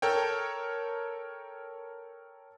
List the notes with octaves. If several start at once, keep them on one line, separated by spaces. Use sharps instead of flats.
A4 A#4 C#5 G5